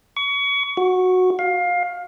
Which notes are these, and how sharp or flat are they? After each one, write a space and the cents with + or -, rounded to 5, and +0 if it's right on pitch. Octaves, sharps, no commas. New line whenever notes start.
C#6 +30
F#4 -10
F5 +20